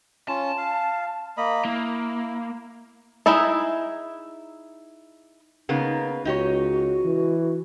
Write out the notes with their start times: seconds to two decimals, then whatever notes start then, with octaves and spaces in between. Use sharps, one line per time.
0.28 C#4 F4 A5
0.58 F5
1.37 A#3 D#5 B5
1.65 A#3 E4
3.26 D#4 E4 G#4 E5
5.69 C#3 A#3 B3 D#4
6.25 C#2 D#4 F#4 G4 C#5
7.05 E3